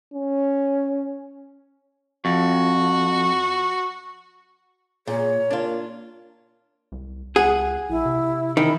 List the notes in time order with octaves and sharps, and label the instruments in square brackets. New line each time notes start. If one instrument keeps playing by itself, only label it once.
[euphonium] C#4
[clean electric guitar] F2 [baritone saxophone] F#4
[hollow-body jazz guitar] A#2 [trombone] G#4 [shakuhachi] C#5
[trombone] A#3 [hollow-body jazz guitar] D4 F4
[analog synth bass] C2
[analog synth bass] C#2 [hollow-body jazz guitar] G#4 [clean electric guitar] F#5
[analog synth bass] A#1 [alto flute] E4
[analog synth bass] C3
[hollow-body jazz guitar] D#3 [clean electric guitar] E3 E4